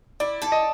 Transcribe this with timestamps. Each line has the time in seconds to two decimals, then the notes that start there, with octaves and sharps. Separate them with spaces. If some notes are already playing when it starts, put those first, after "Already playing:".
0.20 E4 D5
0.42 A4
0.52 D#5